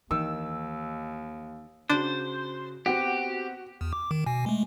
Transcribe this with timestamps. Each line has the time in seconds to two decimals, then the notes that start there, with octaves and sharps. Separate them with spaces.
0.11 D#2 D#3 E3 E6
1.90 C#3 D4 F#4 C5
2.86 B3 C4 F#4 G4
3.81 E2
3.93 D6
4.11 D#3
4.26 B2 G#5
4.46 G#3 A3